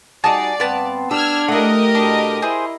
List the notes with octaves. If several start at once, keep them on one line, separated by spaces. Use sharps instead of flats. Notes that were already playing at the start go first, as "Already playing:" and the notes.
G3 D#4 F#4 G#4 D5 A5
G2 B3 C4 F5 A5
D4 G4 E6 F6 G#6
A3 E4 G4 A#4 D#5 F#5
B2 D4
E4 G#4 C5